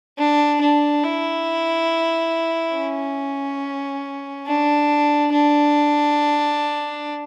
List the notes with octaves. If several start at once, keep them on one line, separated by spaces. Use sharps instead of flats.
D4
D4
E4
C#4
D4
D4